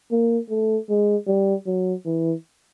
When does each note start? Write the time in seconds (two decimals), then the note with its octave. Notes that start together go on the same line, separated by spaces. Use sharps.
0.11 A#3
0.50 A3
0.89 G#3
1.27 G3
1.67 F#3
2.06 E3